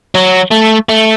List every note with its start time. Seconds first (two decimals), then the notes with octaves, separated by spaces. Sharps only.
0.15 F#3
0.51 A3
0.89 A3